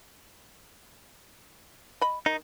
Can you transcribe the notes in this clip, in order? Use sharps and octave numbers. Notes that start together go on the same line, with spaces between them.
D#5 B5
D#3 D#4